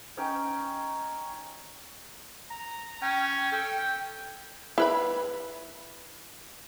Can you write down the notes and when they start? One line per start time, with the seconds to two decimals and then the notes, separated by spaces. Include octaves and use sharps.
0.17 C#4 D#4 C#5 G5
2.50 A#5
3.02 C#4 G5
3.52 A4 G5
4.78 E4 B4 B5